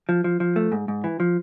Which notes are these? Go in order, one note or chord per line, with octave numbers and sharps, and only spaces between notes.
F3
F3
F3
A3
G#2
G#2
E3
F3